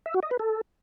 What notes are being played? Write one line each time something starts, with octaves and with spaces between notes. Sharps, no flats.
E5
F#4
D#5
B4
A4